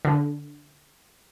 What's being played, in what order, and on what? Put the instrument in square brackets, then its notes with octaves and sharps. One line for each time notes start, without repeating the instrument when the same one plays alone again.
[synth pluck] D3